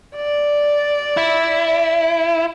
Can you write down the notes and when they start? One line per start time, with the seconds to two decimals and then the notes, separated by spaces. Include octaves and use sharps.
0.16 D5
1.17 E4